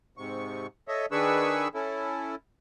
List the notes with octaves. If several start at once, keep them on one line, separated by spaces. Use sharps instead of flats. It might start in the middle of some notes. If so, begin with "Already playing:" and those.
G#2 C3 C#6
A4 C#5 D#5 E5
D#3 D4 G#4 B4 C#6 E6
C#4 E4 A4